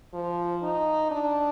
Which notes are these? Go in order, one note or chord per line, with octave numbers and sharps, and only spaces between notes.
F3
D#4
D4